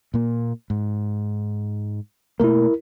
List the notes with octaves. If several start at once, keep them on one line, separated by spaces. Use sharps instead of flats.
A#2 A#3
G#2
B2 A3 A#3 E4 A#4